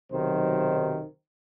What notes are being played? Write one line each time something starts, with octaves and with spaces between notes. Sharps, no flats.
B1 C3 D#3 F#3 C5